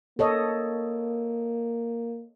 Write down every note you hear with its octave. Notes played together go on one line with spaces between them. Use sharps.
A#3 A4 C#5 D#5